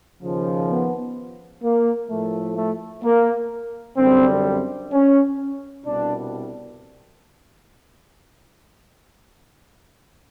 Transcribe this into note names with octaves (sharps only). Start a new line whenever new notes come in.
D#2 C#3 F3
B3
A#3
A2 F3 A3
A3
A#3
F#2 D3 G3 C4
C#4
C2 B2 G3 D4